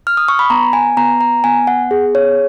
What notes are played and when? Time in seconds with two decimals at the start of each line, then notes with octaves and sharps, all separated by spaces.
0.07 F6
0.17 D#6
0.28 C#6
0.39 B5
0.50 B3 A#5
0.73 G#5
0.97 B3 A#5
1.21 A#5
1.44 B3 G#5
1.67 F#5
1.91 G#4
2.15 C#5